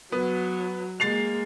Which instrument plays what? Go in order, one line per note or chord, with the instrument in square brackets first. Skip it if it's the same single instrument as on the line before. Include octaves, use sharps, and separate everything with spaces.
[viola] F#3 [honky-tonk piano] B3
[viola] G#3 A#3 [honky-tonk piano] A6 C7 F7